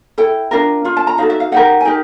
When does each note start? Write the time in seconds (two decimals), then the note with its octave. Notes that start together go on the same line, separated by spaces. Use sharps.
0.18 E4 A4 G5
0.51 D4 F4 A#4
0.85 D4 F4
0.97 A5
1.07 A#5
1.18 D#4 F#4 A4 F5
1.30 E5
1.40 F5
1.52 D#4 G4 A#4 F#5
1.81 G#5
1.85 D#4 G4 A#4 G5